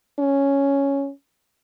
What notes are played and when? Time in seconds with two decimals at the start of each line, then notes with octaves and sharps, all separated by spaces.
0.19 C#4